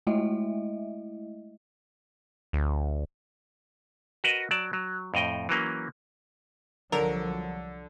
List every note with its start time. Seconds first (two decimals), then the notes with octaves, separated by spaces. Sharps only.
0.07 G#3 A3 E4 D#5 E5
2.53 D2
4.24 F#4 A#4 B4 D#5
4.51 F#3 D5 A5
4.73 F#3
5.14 F2 A2 D#5 G5
5.49 E3 F#3 A#3 C#4
6.92 C2 D3 F3 F#3 A#4